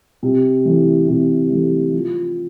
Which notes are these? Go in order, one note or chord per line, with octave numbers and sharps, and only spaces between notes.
C3
E3 A3
C3
E3 A3
F3